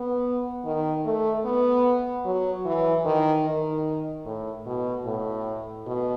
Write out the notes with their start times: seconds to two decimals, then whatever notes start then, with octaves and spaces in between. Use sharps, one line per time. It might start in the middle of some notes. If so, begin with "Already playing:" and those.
Already playing: B3
0.65 D#3
1.05 A3
1.45 B3
2.25 F#3
2.65 E3
3.05 D#3
3.46 D#3
4.25 A2
4.66 B2
5.06 A2
5.86 B2